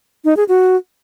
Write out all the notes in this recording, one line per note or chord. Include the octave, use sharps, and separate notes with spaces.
D#4
G#4
F#4